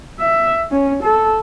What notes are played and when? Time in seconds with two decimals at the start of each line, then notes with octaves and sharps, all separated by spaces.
0.19 E5
0.71 C#4
1.03 A4